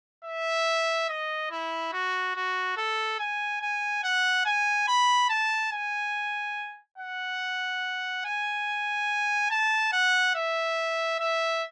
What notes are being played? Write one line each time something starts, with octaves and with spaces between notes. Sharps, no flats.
E5
D#5
E4
F#4
F#4
A4
G#5
G#5
F#5
G#5
B5
A5
G#5
F#5
G#5
A5
F#5
E5
E5